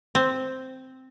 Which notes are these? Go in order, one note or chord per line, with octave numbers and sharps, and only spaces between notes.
C4